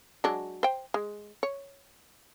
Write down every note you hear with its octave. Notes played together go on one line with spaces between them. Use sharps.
F#3 G#3 D4
C5 G5
G#3
C#5